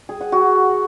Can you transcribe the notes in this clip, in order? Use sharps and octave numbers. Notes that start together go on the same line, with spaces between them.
G#4
F#5
F#4